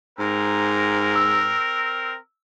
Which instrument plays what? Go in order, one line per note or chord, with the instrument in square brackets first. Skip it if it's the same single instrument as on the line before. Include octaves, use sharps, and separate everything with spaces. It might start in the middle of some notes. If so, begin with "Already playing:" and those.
[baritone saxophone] G#2 [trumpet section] C4 A#4
[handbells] E6